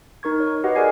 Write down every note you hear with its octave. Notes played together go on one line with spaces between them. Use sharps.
D#4 A#4 C#6 G#6
C#5
F#4 G4 B4 D#5 F#5
G#4 A#4 D5 G#5 G#6 C7